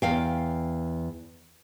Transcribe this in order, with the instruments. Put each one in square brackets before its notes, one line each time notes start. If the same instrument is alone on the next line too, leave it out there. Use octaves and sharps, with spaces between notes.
[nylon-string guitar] E2 F5 G5